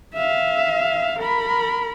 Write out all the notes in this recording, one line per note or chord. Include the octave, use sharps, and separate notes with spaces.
E5 F5
A#4 B5